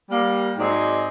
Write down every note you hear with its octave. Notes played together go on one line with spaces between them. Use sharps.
G3 A#3
G#2 F#3 C4 G#4 D5 D#5